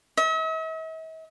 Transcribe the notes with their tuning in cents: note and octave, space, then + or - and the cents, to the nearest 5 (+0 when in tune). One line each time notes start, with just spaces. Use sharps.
E5 -45